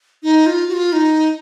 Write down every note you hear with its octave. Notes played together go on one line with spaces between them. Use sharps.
D#4
F4
F#4
F4
D#4